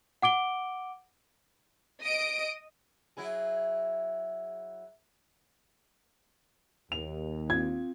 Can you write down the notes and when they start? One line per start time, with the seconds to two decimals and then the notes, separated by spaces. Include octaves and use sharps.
0.22 F#5 D6 D7 G7
2.02 D#5 D#6 D7
3.17 F#3 E4 G#4
6.92 D#2 F7
7.50 C4 F4 G#6